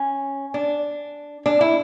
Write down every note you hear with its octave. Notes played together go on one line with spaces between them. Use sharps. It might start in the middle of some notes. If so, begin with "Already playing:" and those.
Already playing: C#4
D4
D4
E4